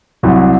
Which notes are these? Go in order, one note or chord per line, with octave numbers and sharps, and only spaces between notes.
C2 C3 F#3